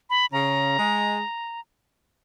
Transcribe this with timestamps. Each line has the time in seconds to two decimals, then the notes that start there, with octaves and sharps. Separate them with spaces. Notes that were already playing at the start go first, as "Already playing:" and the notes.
0.10 B5
0.32 C#3 A#5
0.78 G#3